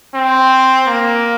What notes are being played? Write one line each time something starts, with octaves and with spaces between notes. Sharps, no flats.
C4
A#3